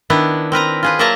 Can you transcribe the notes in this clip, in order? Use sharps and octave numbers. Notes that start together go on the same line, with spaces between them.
D#3 B3 D4 E4
C4 A#4 B4 A#5
F4 G#4 B4
F#3 A#3 A#4 E5 A5 A#5